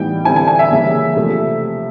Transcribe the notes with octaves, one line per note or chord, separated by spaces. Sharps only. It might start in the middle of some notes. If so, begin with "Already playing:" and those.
Already playing: A2 E3 G3 B3 D#4 G5
D3 G3 C4 E4 G#5
G#5
G#5
E5
C#3 E3 G3 A#3
C3 F3 A3